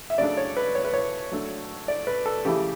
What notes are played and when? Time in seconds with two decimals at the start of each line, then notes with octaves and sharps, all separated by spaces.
0.10 E5
0.18 C#3 F#3 A3 D4 D5
0.37 C#5
0.57 B4
0.75 C#5
0.85 B4
0.94 C#5
1.32 F#3 A3 D4
1.88 D5
2.07 B4
2.26 A4
2.45 C#3 E3 A3 E4 G4